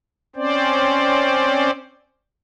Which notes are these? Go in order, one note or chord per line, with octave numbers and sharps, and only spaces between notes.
C4 C#4 C5 D5